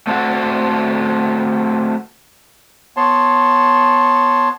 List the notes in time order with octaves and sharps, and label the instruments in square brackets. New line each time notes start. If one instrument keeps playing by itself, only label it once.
[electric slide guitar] A3 C4 D4 E4 F#4 A4
[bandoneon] B3 C#5 A5 C6